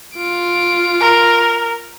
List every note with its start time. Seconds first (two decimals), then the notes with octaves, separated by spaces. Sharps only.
0.15 F4 D7
1.00 A#4